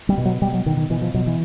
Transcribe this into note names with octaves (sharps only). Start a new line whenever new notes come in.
G3
B2
F#3
B2 G3
F#3
B2 D#3
D#3
B2 E3
F3
B2 F#3
E3